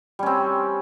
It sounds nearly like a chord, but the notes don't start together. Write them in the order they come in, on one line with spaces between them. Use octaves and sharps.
G3 C#4 C4